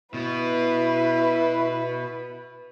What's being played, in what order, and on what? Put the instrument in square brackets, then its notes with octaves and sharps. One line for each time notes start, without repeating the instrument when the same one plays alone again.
[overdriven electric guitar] B2 B3 [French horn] E4 [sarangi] B4